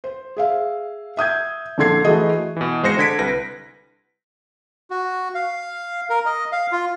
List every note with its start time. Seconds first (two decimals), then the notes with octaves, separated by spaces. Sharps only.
0.04 C5
0.37 G#4 E5 F5
1.17 E5 D#6 G6 G#6
1.78 A#1 D3 A4 C6 G#6 C7
2.05 E3 A3 F#4 G#4 D#5
2.56 B2 E3
2.83 G#1 G#3 C5 A#6 C#7
2.98 D3 G#6 B6 D7
3.19 C2 B4 A#6
4.90 F#4
5.35 F5
6.10 A#4
6.25 D#5
6.52 F5
6.72 F4